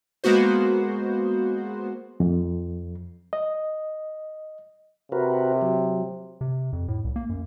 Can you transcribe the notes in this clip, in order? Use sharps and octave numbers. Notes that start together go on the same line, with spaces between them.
G#3 A#3 B3 F#4 C5
F2
D#5
C3 F#4 A#4 B4
F#3
C3
F2
A2
C2
A#3
F#2